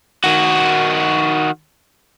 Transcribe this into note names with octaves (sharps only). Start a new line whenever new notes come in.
D#3 F#4